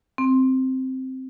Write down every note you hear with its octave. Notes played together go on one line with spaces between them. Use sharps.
C4